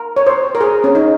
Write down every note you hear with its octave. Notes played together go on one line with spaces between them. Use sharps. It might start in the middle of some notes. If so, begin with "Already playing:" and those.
Already playing: A#4
C#5
C5
A#4
G#4
C#4
D#4